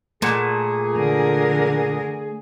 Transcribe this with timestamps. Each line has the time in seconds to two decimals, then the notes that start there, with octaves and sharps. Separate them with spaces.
0.22 A#2 A3 G#4 F#5 A5
0.95 D3 A#4